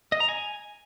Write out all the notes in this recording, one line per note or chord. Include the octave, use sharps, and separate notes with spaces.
D#5
A#5
G#5